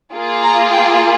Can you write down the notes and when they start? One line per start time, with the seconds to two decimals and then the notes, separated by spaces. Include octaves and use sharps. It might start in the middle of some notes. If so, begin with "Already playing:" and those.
0.13 A#3 F4 G#4
0.43 A#5
0.72 G5